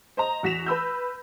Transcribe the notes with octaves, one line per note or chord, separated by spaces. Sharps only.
C5 D#5 A#5
E2 F#4 A#6 B6 E7 F7
B4 B5 E6 G6